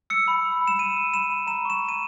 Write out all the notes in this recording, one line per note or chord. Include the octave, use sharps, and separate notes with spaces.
E6 C#7
B5
B5
B5
E7
B5 D#7
E6
B5 E7
B5
A#5 E7
C#6 E7
A#5
D#7